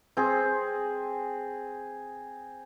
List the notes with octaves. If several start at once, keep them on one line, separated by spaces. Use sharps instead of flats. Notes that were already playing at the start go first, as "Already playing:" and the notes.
C4 G#4